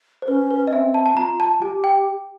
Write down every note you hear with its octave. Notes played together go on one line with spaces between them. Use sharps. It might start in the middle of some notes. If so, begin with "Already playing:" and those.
C5
C#4 B4
B4
D#5
C4 E5
A5
A5
F4 A#5
A5
G4 G#5
G5